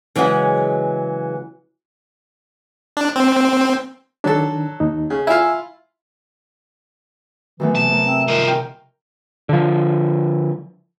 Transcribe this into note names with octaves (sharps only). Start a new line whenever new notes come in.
C#3 E3 F#3 G#3 D#5 F#5
D4
C4
D#3 F#3 D4 A4
D#2 D#4
C#3
E4 F4 G#5 E6
F#2 A2 D#3 E3 B3
C3 A5
A2 F3 A#4
C4 E5
G2 D#3 F3 A#4
E2 G5 F6
D3 F3